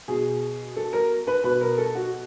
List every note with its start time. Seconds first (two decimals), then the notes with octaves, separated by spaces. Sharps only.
0.08 B2 G#4
0.76 A4
0.93 A#4
1.27 B4
1.44 B2 B4
1.61 A#4
1.78 A4
1.95 F#4